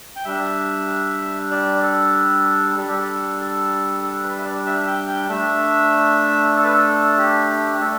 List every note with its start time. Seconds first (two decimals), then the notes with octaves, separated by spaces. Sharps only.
0.16 G5
0.25 G3 D4 E5
1.51 D5
1.82 A4
2.77 G3 D4 A4
2.88 G4
2.98 A4
3.40 A4
4.03 A4
4.24 B4
4.39 E5
4.45 D5
4.66 E5
4.87 G5
5.08 G5
5.29 A3 D4 E5
6.55 A4
6.64 B4
6.73 A4
7.18 G4
7.81 A3 A4